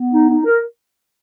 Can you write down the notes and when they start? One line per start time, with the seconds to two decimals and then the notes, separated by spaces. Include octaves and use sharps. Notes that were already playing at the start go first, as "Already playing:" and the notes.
Already playing: B3
0.10 D#4
0.28 D#4
0.45 A#4